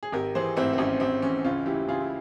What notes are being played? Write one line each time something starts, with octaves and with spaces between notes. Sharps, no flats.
G#4
G#1 G4 A#4
E3 G#4 C5
G#2 C4 E4
C4
G#1 C#4
G#1 C4
E3 C#4
C#2 C#4 F4
E3 E4 G4
C#3 F4 G#4
E4